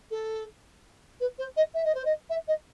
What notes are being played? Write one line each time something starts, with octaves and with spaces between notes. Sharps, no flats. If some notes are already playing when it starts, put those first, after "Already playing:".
A4
B4
C5
D#5
E5
D#5
C5
D#5
E5
D#5